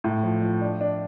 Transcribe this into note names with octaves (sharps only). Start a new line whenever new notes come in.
A2
F3
F3
D4
D4